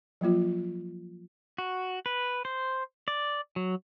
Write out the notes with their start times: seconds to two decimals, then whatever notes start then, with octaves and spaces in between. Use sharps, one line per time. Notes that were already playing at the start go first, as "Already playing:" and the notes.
0.21 F3 F#3 A#3 F4
1.58 F#4
2.06 B4
2.45 C5
3.08 D5
3.56 F#3